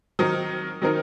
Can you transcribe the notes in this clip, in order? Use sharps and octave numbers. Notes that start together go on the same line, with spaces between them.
D#3 F#3 C4 D#4 A#4
D#3 F#3 C4 D#4 A#4